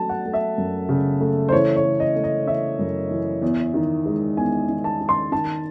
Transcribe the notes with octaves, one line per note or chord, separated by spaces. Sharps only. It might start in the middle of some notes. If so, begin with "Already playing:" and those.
Already playing: F#3 A3 A5
F#5
A3
E5
F#2
C#3
A3
C5
E3 C#5
C#5
A3
D#5
A3
D#5
E3 E5
F#2
E3
E2
D#3
G#3
E2 G#5
D#3
A5
D#3
C6
D#3 A5